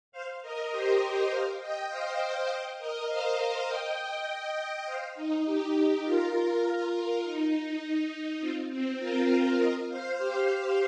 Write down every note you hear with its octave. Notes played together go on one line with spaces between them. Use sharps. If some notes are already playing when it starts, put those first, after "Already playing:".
C5 F5
A#4 D#5
G4 C5
A#4 D#5
C5 F5
D#5 G5
C5 F5
D#5 G5
A#4 D#5
C5 F5
D#5 G5
C5 F5
D#4
D#4 G4
F4 A#4
F4 A#4
D#4
C4 F4
C4
F4 A#4
A#4 D#5
C5 F5
G4 C5